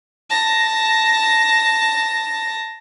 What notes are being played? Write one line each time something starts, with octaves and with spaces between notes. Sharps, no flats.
A5 A#6